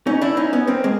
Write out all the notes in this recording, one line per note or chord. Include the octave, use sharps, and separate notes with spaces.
C#4 D#4
D4 E4
C#4 D#4
B3 C#4
A#3 C4
G#3 A#3